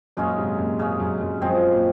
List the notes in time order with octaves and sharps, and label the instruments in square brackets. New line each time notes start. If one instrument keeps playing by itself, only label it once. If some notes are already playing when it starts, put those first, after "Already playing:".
[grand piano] F#2 A#2 [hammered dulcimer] C#3 G#3 C#4
[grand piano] G#2 C3
F#2 A#2
[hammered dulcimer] C#3 G#3 C#4
[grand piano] F#2
F#2
[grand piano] F#2 [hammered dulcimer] F3 G#3 C4
[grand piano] A#2